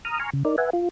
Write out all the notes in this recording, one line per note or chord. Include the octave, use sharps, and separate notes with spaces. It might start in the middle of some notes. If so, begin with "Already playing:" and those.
A#5 D#6 F6
G#5 A#5 C6 C#6 F6
C#3
D#4 A#4 D5
B4 E5 F#5 G#5
F4